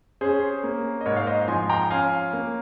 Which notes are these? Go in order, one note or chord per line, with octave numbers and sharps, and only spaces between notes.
C#4 G#4 C5
A#3
D#5
G#2 A#4 C#5
F5
C5 D#5
F3 G#5 C6
G5 A#5
C#4 F5 G#5
A#3